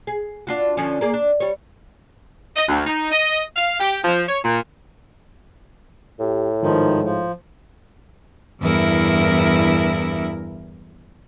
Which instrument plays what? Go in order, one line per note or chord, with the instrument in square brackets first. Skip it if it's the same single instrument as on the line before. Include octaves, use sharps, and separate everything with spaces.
[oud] G#4
D4 F4 F#4
D3 F3 C#4
A#3 G#4 D5
D4
G3 C#5
[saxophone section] D#5
D2
D#4
D#5
F5
G4
F3
C#5
A#2
[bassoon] A2 [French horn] G4
[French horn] G#2 [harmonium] D#3 F3
[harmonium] F3
[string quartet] E2 G2 E4 A#4